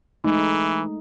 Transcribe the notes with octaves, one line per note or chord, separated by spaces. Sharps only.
E3 G#3 A3 D#4